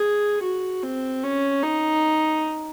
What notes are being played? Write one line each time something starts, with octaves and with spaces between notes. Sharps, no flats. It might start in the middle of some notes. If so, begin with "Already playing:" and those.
Already playing: G#4
F#4
C4
C#4
D#4